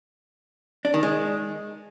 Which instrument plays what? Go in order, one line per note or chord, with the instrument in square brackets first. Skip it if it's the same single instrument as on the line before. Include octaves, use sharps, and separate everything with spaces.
[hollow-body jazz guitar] D4
D#3
G#3